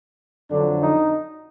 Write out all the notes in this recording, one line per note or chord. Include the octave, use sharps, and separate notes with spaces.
F2 D3 F#3 D4
D#4